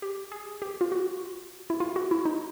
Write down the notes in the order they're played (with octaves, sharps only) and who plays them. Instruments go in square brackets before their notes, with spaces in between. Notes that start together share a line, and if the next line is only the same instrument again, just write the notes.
[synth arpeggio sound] G4
G#4
G4
F4
F#4
E4
F4
F#4
E4
D#4